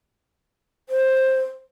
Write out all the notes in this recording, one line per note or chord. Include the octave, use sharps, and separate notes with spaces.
C5